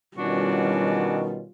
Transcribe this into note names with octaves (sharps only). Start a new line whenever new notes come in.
B2 D#3 E3 G3 C#4 D4 F4 F#4